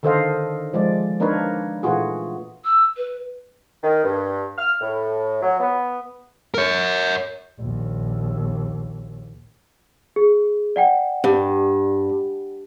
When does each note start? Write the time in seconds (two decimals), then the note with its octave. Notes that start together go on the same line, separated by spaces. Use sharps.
0.03 D3 D#3 A4 C5 D#5 F5
0.74 F3 G#3 D5
1.20 A#3 D4 D#4 A#4 B4 C#5
1.83 A#2 E3 A3 F4 F#4 G#4
2.64 E6
2.97 B4
3.83 D#3
4.04 G2
4.58 F6
4.81 A2
5.42 F#3
5.59 B3
6.54 A#4 C#5
7.60 A#1 D#2
10.16 G#4
10.76 D5 F#5 G5
11.24 G2